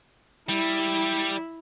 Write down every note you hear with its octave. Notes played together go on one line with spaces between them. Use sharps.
G3 E4